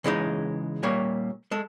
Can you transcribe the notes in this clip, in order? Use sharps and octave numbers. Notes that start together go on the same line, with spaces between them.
C#3 E3 G#3 D#4
A#2 G3 A#3 C#5
G#3 A4